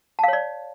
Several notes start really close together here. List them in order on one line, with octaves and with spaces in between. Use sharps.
A5 F5 C#5 D5